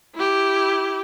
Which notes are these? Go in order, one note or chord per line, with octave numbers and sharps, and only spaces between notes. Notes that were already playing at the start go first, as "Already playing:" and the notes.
E4 G4